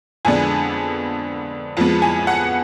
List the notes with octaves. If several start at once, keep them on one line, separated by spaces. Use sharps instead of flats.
F2 D3 G#3 B3 D4 G#5
F2 F3 G#3 B3 A5
G#5
F#5